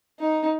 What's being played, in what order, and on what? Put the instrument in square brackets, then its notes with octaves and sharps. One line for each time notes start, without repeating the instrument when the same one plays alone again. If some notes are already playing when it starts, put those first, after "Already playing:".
[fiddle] D#4